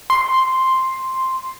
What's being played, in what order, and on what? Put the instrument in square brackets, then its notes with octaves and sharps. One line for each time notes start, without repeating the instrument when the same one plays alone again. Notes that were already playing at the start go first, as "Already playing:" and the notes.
[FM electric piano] C6